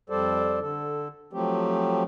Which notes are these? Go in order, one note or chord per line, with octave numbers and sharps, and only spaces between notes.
F2 G3 A4 C5 D5
D3 A4
F3 F#3 A3 C4 G4